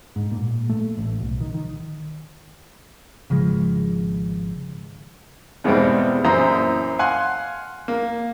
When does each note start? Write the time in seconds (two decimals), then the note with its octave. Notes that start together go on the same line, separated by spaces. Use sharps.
0.16 G#2
0.31 A#2
0.69 A3
0.97 A1
1.20 B1
1.41 D#3
1.54 D#3
3.30 G#1 C#3 F3 G#3
5.64 E2 G#2 B2 G3 B3 C4
6.24 F#2 A#2 E3 C5 A#5 D#6
6.99 F5 F#5 G#5 C6 F#6
7.88 A#3